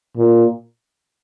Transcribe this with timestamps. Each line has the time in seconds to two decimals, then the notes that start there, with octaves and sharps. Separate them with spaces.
0.17 A#2